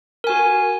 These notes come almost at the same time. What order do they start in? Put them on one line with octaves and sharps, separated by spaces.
A#4 G#5 F#4